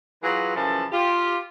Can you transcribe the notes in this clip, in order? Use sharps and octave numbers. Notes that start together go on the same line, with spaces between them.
E3 F#3 F4 G#4 B4
F#2 C#3 E3 F3 A4 A5
F4 G4